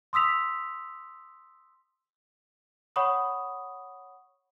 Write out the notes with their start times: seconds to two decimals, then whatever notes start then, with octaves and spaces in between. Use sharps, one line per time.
0.13 C6 D#6 E6 B6 F7
2.96 C#5 F#5 B5 C#6 D#6